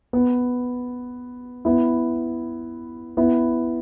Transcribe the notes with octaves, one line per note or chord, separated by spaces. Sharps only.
B3
B3 E4
B3 E4